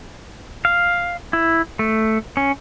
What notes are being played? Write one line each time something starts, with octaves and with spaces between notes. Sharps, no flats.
F5
E4
A3
C#4